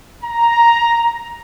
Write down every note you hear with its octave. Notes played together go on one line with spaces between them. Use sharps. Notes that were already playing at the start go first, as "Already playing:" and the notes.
A#5